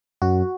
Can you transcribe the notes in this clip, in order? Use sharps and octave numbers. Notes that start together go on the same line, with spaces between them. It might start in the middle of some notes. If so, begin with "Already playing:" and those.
F#2 F#4